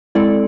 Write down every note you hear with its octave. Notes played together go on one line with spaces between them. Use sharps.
G#3 C4 E4 A4 D5